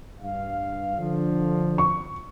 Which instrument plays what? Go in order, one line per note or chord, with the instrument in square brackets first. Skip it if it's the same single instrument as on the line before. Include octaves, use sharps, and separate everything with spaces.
[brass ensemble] G2 F5
D3 F3
[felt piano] C#6